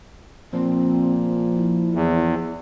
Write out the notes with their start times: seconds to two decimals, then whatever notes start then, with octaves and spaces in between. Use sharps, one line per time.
0.53 A#2 F3 C4
1.55 E4
1.95 E2